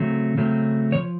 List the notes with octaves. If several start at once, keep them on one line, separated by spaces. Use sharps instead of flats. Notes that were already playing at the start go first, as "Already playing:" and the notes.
Already playing: C#3 F#3 A3 C4
C#3 F#3 A3 C4
C#3 F3 C#5